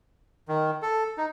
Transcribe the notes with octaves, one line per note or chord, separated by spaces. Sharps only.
D#3
A4
D#4